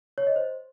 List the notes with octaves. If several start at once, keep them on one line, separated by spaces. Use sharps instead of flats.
C#5
D#5
C5